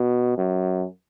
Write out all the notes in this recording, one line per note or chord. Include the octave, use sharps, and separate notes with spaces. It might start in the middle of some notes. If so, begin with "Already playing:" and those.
Already playing: B2
F#2